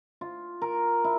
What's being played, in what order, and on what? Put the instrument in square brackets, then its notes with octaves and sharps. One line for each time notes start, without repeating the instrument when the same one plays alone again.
[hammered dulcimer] F4
A#4
E4